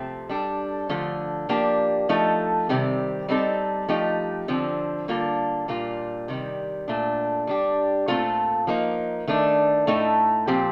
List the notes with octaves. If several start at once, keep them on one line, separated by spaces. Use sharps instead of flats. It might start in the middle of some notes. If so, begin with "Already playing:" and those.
Already playing: C3 F3 A3 C4
G3 D4 A4
D3 F3 A3
F3 A#3 D4 G4
F3 A3 D#4 A4
C3 D#3 G3 C4
G3 C4 D#4 A4
F3 A3 D#4 G4
D3 F3 C4
D3 G3 A#3 F4 A4
A#2 G3 A#3 D4 F4
C3 D#3 G3
A#2 A3 D4
G3 D4 G4
A#2 A3 C4 F4 A4
F3 A#3 D#4
D#3 A3 D4
A2 A3 D#4 A4
A#2 F3 C4 G4